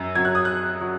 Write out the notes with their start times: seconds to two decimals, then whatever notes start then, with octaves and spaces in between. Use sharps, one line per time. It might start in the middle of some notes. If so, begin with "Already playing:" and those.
Already playing: F#2 F#3
0.15 F#2 F#3 G#6
0.25 F#6
0.35 D#6
0.45 F#6
0.81 F#3